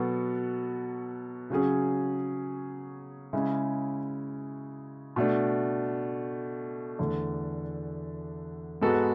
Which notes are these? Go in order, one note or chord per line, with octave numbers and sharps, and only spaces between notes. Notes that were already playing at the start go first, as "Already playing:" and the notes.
Already playing: B2 F#3 B3 F#4 A4
C#3 F#3 C#4 G#4
C#3 G#3 C#4 E4
B2 A3 D4
E2 D3 A3 D4 A4
G#2 G#3 B3 F#4 A4